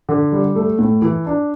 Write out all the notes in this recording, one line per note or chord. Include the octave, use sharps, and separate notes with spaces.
D3
G3
A3
A2
E3
D4